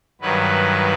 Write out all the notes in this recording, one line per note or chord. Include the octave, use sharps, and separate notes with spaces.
G2 D#3 F#3 B4